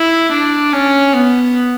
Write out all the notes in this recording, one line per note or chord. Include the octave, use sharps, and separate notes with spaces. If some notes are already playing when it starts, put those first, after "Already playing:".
Already playing: E4
D4
C#4
B3